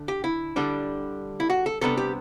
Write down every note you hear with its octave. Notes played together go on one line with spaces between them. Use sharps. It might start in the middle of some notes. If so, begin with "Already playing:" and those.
Already playing: D3 A3 D4
G4
E4
D3 G3 D4
E4
F#4
A4
C3 G3 B3 D4 A4
G4